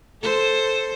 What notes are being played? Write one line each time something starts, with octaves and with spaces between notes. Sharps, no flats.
A4 C5